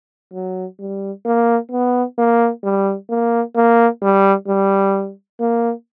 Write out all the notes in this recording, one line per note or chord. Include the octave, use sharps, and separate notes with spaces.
F#3
G3
A#3
B3
A#3
G3
A#3
A#3
G3
G3
A#3